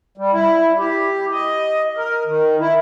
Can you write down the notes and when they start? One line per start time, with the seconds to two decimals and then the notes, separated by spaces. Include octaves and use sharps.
0.18 G3
0.32 E4
0.78 G4
1.32 D#5
1.97 A#4
2.26 D#3
2.60 E4